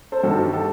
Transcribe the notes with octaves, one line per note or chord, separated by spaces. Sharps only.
A4 C5
G2 D#3 F#4 A4
G4
A4